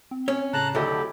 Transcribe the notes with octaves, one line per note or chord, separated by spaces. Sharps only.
C4
C#4
A2 C#3 A5 A#5 F#6
D2 D#3 F#3 E4 G4 A4 D#5